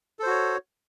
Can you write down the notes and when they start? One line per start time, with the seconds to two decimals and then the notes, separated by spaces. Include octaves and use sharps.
0.19 A4
0.23 C5
0.27 F#4
0.30 C#5